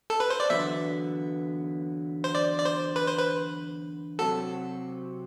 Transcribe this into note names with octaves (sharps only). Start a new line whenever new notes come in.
A4
B4
C5
D5
E2 D3 F#3 B3 E5
C5
D5
D5
C5
B4
C5
B4
C3 F#3 C4 F#4 A4